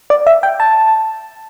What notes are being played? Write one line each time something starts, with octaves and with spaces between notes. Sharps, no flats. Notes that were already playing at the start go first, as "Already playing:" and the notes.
D5
E5
G5
A5